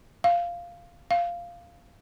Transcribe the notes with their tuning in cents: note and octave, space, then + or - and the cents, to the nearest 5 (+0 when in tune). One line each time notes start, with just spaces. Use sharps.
F5 -5
F5 -5